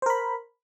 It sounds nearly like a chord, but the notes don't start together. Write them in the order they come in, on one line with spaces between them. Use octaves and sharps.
C5 A#4 B5